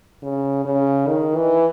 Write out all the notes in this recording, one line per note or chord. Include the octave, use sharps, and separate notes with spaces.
C#3
C#3
D#3
E3